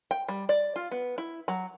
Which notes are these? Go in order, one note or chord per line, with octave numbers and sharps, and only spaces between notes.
G5
G3
D5
F4
B3
E4
F#3